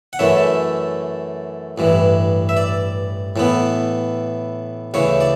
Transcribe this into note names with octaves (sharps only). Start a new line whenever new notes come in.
F#5
F#2 E3 A3 C#4 E5
A1 G2 E3
E5
D5
A2 E3 B3
D2 C#3 E3 C#5
D5